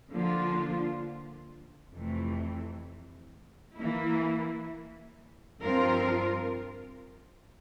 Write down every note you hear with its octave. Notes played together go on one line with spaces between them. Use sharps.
D3 F3 A#3 D4 F4
F2 C3 E3 A3 C4
E3 A#3 E4
G2 F3 C4 F4 A#4